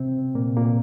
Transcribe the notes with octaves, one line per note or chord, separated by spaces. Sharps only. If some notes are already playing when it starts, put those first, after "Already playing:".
Already playing: C3 C4
A#2 A#3
A#2 A#3